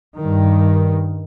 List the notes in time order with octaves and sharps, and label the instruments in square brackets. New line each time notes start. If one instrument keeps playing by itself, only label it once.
[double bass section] G2 D#3